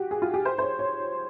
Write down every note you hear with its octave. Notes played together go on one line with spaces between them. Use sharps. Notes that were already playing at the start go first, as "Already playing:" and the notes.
Already playing: F#4 G4
G#4
F4
G4
C5
C5
C#5
C#5